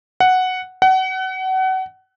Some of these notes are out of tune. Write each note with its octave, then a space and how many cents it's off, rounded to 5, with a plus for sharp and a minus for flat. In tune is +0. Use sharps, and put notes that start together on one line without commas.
F#5 +0
F#5 +30